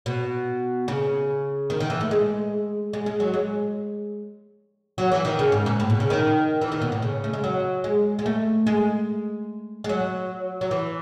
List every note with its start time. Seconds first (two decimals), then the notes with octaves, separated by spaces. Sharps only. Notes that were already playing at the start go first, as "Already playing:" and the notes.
0.06 B2
0.88 C#3
1.70 D#3
1.80 D#3
1.90 E3
2.01 A3
2.11 G#3
2.93 G#3
3.06 G#3
3.20 F#3
3.34 G#3
4.98 F#3
5.12 E3
5.25 D#3
5.39 C#3
5.52 G#2
5.66 G#2
5.80 A2
5.90 B2
6.00 C#3
6.10 D#3
6.61 E3
6.72 D#3
6.82 B2
6.92 A2
7.02 C#3
7.24 A3
7.33 G#3
7.44 F#3
7.84 G#3
8.19 G#3
8.26 A3
8.67 G#3
9.84 G#3
9.89 F#3
10.61 F#3
10.71 E3